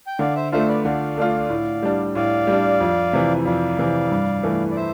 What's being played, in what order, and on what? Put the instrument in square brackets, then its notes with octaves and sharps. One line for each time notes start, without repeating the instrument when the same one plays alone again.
[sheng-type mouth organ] G5
[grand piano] D3 [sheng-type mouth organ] D5 F5
[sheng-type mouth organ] C5 E5
[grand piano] A3 D4 F4 [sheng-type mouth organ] C5 E5
[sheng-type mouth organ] B4 D5
[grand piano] D3 [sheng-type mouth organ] D5 F5
[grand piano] A3 D4 F4
A2
G3 D4
[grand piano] A2 [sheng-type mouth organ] D5 F5
[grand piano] G3
D4
F2
C3 E3
[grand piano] F2 [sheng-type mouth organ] D5 F5
[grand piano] C3 E3
G2
E3 A3
[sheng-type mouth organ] D5
C5 E5